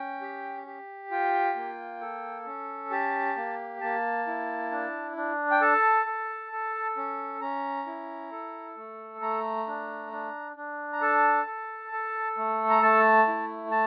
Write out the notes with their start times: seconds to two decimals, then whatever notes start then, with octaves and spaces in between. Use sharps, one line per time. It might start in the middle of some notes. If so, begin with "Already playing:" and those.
Already playing: C#4 G5
0.21 G4
0.67 G4
1.11 F4 G5
1.56 A#3
2.01 A4
2.46 C#4
2.91 G4 A5
3.37 A#3
3.81 A#3 A5
4.27 E4
4.71 D4
5.17 D4
5.51 G5
5.61 A4 A5
6.06 A4
6.52 A4
6.97 C#4
7.41 C#4 A#5
7.86 E4
8.32 A4
8.77 A3
9.21 A3 A#5
9.67 D4
10.12 D4
10.56 D4
10.93 A#5
11.01 A4 A5
11.47 A4
11.92 A4
12.37 A3
12.70 A#5
12.82 A3 A5
13.28 E4
13.71 A5